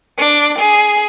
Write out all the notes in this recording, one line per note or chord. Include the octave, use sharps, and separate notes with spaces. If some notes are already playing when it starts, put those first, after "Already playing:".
D4
G#4